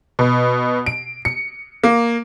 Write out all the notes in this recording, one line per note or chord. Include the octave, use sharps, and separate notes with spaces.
B2
D7
C#7
A#3